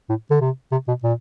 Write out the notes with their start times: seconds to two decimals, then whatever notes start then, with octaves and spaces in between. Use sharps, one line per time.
0.09 A2
0.30 D3
0.40 C3
0.71 C3
0.88 B2
1.03 A#2